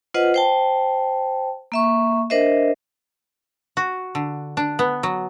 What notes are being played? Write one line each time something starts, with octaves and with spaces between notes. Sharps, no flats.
F4 B4 C5 D#5 F#5
C5 G5 A5
A#3 E5 C#6
D4 A#4 C5 D#5 E5
F#4
D3
D4
B3
F#3